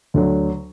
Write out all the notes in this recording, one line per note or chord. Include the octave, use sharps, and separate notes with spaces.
D2 D3 F#3